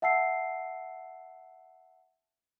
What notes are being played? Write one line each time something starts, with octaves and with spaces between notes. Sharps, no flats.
E5 F#5 A5 E6 C7